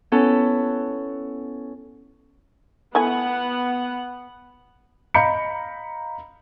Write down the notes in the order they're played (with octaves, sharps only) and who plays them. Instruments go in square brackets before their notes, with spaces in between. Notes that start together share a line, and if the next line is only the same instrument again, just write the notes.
[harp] B3 C#4 E4 A4
[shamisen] A3 E4 G#5 [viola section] B3 F#5
[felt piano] D#5 F5 A#5 B5 G6 C#7